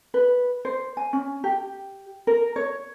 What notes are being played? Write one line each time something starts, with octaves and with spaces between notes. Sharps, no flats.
B4
C5
G#5
C#4
G4
A#4
C#5